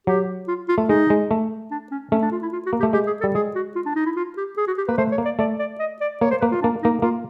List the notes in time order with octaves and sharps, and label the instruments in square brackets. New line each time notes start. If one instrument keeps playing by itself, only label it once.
[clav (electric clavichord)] F#3 [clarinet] G4
[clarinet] F4
F4
[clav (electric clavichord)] A3
[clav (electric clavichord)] G#3 [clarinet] D#4
[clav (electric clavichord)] G#3
A3
[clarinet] D4
C#4
[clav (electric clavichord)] A3 [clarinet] C#4
[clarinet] D4
F4
E4
F4
F#4
[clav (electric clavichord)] A#3
[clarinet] G4
[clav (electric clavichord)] A3
[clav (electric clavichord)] G#3 [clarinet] G4
[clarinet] G#4
A4
[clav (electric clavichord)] G3
[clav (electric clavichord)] G#3 [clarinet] G#4
[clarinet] F#4
F4
D4
D#4
E4
F4
G4
G#4
F#4
G4
[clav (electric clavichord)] A#3 [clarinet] B4
[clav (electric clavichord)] A3 [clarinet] C5
[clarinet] C#5
[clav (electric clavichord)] A#3
[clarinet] D5
[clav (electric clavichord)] A3 [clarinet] D5
[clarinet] D5
D#5
D5
[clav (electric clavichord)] A#3 [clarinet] C#5
[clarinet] C5
[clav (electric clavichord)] A#3 [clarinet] B4
[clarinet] F4
[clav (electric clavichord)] A#3 [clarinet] D4
[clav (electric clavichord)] A#3 [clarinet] D#4
[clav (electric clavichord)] A#3 [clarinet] F4